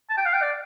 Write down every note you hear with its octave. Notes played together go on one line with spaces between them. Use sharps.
A5
G5
F5
G5
D5